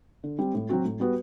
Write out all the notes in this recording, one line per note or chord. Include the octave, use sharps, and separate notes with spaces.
D3
G3 C4
A2
F#3 C4 F#4
A2
G3 B3 F#4 B4